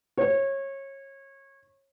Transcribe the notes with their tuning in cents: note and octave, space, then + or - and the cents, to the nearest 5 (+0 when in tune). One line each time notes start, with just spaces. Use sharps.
C#5 -25